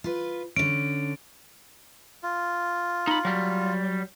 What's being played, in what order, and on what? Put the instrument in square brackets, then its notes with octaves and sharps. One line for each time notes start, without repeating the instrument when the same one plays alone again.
[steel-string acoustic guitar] F4 B4
[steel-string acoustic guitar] D3 C#4 [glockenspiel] D7
[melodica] F4
[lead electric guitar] D#4 B5
F#3 G3